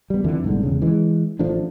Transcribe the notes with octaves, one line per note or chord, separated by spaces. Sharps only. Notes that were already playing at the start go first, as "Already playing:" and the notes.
G3 B3
F2 D3 E3
G1 C2 G#2 D3
E1 C#3
E3 G#3
A1 F3 A3 D4